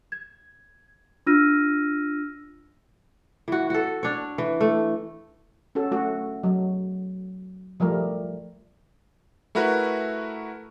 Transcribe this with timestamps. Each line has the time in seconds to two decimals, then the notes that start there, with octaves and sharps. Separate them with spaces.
0.12 G#6
1.27 D4 F4 E6 F6 A#6 D#7
3.48 E3 F#4
3.70 F#4 A4
4.03 D4 C#5
4.38 E3
4.61 A3
5.75 C#4 F#4 A4
5.91 A3 F#4
6.43 F#3
7.80 F3 G3 A3 A#4
9.55 A3 E4 F#4 A#4 B4